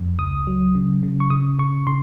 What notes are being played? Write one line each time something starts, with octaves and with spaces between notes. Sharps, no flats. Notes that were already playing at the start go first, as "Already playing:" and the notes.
Already playing: F2
C#2 D#6
F#3
C#3
C#3
C#6
C#3 D#6
C#3 C#6
C#3 C6